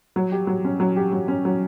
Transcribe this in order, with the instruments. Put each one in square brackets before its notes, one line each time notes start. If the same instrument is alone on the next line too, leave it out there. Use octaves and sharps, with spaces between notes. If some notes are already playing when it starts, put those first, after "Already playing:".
[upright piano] F#3
G4
F#3
C#4
F#3
G4
F#3
C#4
F#3